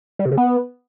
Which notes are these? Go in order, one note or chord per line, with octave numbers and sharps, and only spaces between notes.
G3
C3
C#3
B3